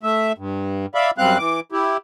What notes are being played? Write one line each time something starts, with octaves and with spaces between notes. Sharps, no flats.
A3 E5
G2
D5 E5 F5 B5
F#2 G3 C4 F5 F#6
E3 D6
E4 G4